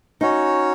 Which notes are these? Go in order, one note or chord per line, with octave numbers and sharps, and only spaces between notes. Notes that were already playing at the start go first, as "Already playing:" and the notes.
C#4 D#4 F#4 C#5